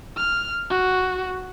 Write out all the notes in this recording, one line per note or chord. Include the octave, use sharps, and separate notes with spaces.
F6
F#4